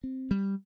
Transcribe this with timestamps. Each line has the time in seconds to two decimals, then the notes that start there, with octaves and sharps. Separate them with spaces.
0.04 C4
0.31 G3